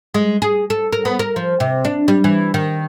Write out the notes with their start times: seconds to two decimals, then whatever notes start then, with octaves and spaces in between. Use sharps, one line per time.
0.14 G#3
0.42 G#4
0.70 A4
0.93 A#4
1.05 B3
1.19 A#4
1.36 F3
1.60 C3
1.85 D4
2.08 G3
2.24 E3
2.54 D#3